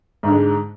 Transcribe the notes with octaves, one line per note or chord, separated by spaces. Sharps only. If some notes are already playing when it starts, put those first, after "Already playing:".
G#2 D3 G#3